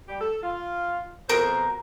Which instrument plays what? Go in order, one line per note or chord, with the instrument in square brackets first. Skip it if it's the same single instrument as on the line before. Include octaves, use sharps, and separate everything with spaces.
[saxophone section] G3 G4
A4
F4
[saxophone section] F2 B2 C5 [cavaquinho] A#4 A#5